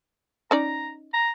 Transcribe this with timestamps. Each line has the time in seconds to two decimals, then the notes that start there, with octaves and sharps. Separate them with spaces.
0.51 C#4 D#4 D5 A#5
1.14 A#5